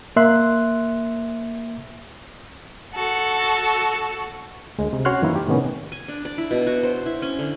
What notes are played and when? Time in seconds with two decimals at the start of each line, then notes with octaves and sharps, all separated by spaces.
0.16 A#3 E5 C6 F#6
2.94 F#4 A4
4.79 D2 G#3
4.93 C3
5.05 C#4 F#4 C#5 C6 F6 F#6
5.22 F#2 D#3 E3 A#3 E4
5.36 G4
5.47 A2 C3 D#3 B3 C#4
5.92 G#5
6.08 D4
6.25 D5
6.38 E4
6.51 B2
6.67 F#4
6.83 C5
7.06 E4
7.22 C#4
7.39 D3